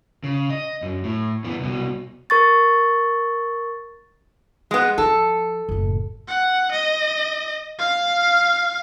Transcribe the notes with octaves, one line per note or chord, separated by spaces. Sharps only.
C#3
D#5
F#2
A2
F2 B3
C2 B2
A#4 C#6 A6
G#3 B3
F3 A4
F#1 A2
F#5
D#5
F5